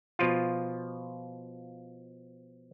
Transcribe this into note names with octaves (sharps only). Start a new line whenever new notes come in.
B2 F3 F4